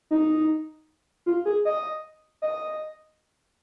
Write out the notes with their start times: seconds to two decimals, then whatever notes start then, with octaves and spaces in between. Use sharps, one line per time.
0.11 D#4
1.26 F4
1.45 G#4
1.65 D#5
2.42 D#5